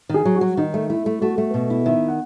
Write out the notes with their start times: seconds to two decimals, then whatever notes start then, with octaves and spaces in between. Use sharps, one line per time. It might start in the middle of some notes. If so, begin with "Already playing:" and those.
0.09 D#3 G#4
0.25 F#3
0.36 F#4
0.41 F#3
0.57 D#3 D#4
0.74 A3
0.90 A3 E4
1.06 A3
1.21 A3 F#4
1.38 A3
1.54 B2
1.70 E4
1.86 D#3 E5
2.08 F#5